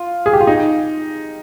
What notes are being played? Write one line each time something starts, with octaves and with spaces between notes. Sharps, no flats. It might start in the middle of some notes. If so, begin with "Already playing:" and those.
Already playing: F4
G#4
G4
F4
D#4